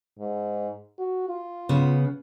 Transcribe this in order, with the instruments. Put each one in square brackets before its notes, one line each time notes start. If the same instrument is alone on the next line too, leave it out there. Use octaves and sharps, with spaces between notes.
[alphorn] G#2
F#4
F4
[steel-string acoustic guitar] C#3 B3